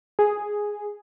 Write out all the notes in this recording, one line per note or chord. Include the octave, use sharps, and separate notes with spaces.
G#4